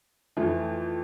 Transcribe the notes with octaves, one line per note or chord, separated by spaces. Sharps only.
F2 E3 A3